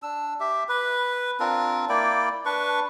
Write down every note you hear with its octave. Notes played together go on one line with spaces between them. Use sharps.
D4 E6
G4 E5
B4
C4 D4 F4 A#4
A#3 E4 D5 G5
D4 B4 C#6